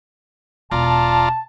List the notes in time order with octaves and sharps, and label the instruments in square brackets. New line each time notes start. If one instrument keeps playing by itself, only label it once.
[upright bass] E1 [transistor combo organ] F4 D5 A#5 [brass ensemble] A5